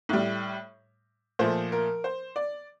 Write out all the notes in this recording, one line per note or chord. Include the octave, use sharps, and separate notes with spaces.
A2 G3
A#2 F3 A3 C5
A#4
C5
D5